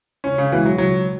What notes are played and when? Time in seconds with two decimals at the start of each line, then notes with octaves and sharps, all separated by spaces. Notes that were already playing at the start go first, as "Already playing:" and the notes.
0.24 C#2 C#4
0.38 C#3
0.52 B2 E3 G#3 B3 F#4
0.65 F#3
0.78 C#2 F#3